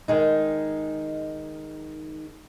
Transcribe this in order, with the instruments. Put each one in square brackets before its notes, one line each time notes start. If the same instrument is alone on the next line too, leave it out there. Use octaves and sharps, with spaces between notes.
[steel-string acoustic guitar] D#3 G#3 D#4